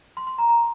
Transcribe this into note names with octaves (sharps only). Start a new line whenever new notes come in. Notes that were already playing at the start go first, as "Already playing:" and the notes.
C6
C6
A#5
A#5